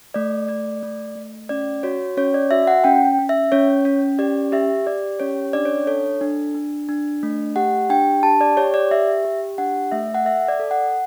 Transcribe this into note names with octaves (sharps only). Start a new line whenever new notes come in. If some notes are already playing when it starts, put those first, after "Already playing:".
A3 D5
A3 D5
A3
A3
C#4 D5
F#4 C#5
C#4 C#5
D5
F#4 E5
F#5
C#4 G5
C#4
E5
C#4 C#5
C#4
G4 D5
G4 E5
G4 D5
C#4 C#5
D4 D5
C#5
A4 C#5
D4
D4
D4
A3
G4 F#5
D4 G5
G4 A5
D5
G4 C#5
D5
G4 E5
G4
D4 F#5
A3 E5
F#5
A4 E5
D5
A4
F#5